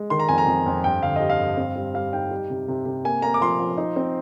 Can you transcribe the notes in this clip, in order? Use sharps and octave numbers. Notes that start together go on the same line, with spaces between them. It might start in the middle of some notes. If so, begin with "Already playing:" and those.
Already playing: G#3
D#3 C6
A#5
F2 G#5
A#5
F2
F2
G2 G5
D3 F5
G3 D#5
F5
G2
C4
G3
G3 F5
D#4 G5
G3
C3
C3
C3
A#3 G#5
A#3 A#5
D6
F3 C6
F3
D#4
C4